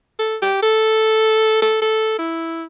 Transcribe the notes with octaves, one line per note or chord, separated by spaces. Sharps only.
A4
G4
A4
A4
A4
E4